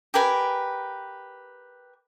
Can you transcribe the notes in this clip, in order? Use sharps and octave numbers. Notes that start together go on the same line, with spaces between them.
G4 A#4 B4 G#5